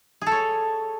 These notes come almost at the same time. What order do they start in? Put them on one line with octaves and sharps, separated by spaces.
G#4 A4 C#5